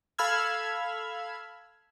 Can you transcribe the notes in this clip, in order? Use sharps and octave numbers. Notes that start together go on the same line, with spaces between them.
A4 F5 B5 E6 F6 G#6